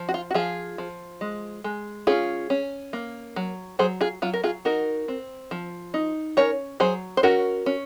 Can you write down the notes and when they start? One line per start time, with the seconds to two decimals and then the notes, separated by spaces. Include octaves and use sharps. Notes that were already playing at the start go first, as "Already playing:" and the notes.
Already playing: F3
0.09 F#4
0.14 F4
0.31 F#4
0.34 F3 F4 G#4
0.78 F3
1.21 G#3
1.64 G#3
2.07 C#4 F4 G#4
2.50 C#4
2.93 A#3
3.36 F#3
3.79 F#3 G#4 C5
4.01 F4 G#4
4.22 F#3 F4
4.34 A#4
4.44 F4 G#4
4.65 D#4 F#4 A#4
5.08 C4
5.51 F3
5.94 D#4
6.37 C#4 A#4 C#5
6.80 F#3 G#4 C5
7.17 C5
7.23 C#4 F#4 A#4
7.66 C#4